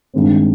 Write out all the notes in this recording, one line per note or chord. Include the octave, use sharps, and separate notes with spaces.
G2 D#3 G#3 C4